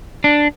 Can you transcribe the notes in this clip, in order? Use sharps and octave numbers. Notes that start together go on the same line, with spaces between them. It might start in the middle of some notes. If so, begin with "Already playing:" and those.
D4